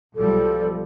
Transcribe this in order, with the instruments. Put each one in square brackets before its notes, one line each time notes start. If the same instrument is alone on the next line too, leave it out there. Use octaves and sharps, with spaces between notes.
[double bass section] B1 F3 G3 [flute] A4